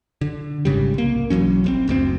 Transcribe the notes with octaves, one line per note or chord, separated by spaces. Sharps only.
D3
G#1 G#2 C#3 G3
C2 A#3
B1 E3 F#3 C#4
G1 B2 C4
F#1 D2 A2 C4